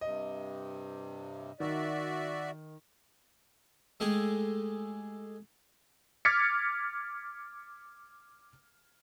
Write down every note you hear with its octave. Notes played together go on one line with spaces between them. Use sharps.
G2 C3 D#5
D#3 F#4 D5 E5
G#3 A3 G4 G#4
D6 F6 G#6 A6 B6 C#7